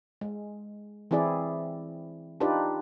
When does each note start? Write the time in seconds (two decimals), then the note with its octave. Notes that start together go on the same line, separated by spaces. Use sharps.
0.21 G#3
1.11 E3 C4 E4 G#4 D5
2.40 D4 D#4 F4 G4 B4 D5